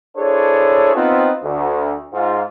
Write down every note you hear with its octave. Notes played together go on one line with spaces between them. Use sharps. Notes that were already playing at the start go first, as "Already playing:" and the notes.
D4 E4 G#4 A4 C5 C#5
B3 C4 D#4 F4
D2
G#2 F4